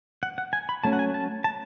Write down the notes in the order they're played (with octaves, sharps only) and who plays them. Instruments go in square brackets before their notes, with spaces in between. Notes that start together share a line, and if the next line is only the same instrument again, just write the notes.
[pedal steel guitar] F#5
F#5
G#5
B5
F#3 A3 C#4 A5
F#5
G#5
A5
A5